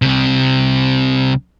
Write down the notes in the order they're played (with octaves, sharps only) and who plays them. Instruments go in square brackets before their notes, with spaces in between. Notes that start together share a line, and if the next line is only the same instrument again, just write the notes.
[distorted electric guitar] C2 C3